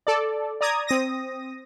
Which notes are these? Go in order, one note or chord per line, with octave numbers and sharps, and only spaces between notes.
A4 D5
D5 A#5 D#6 G#6
C4 D#6 A#6